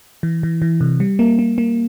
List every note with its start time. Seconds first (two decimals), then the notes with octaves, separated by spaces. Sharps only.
0.23 E3
0.43 E3
0.62 E3
0.81 C3
1.00 G3
1.19 A#3
1.39 A#3
1.58 A#3